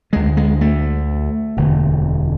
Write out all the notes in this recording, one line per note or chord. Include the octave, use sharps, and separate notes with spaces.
D2 D3 G#3
G#3
A3
E1 D2 D3